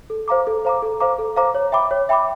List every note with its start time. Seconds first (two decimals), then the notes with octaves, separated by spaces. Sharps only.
0.10 A4
0.28 C5 F5 A#5 D6
0.47 A4
0.65 C5 F5 A#5 D6
0.82 A4
1.00 C5 F5 A#5 D6
1.18 A4
1.36 C5 F5 A#5 D6
1.55 C#5
1.72 E5 G5 B5 D6
1.91 C#5
2.09 E5 G5 B5 D6